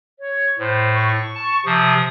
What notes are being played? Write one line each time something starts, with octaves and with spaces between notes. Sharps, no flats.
C#5
A2 C5
C#6
A5
C3 F3 D#6